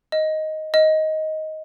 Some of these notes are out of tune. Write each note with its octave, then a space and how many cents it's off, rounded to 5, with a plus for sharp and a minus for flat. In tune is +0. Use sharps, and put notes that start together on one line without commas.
D#5 +5
D#5 +10